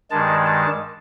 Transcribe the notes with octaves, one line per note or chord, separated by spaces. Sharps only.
G2 D#3 G#3 A5
A5